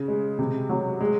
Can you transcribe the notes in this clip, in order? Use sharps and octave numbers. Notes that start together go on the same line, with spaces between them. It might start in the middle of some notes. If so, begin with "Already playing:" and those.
Already playing: C#3
G#3
C3
F#3
G#3